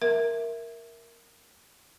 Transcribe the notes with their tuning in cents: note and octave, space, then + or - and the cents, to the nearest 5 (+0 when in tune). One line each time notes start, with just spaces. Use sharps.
A#4 +0 E5 +0